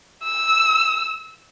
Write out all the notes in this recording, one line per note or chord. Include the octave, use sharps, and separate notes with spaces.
E6